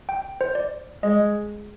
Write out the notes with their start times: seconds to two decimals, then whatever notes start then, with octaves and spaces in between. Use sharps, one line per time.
0.09 G5
0.41 C5
0.55 D5
1.03 G#3 D#5